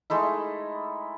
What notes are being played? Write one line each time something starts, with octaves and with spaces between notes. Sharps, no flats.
G#3 A3 D#4 E4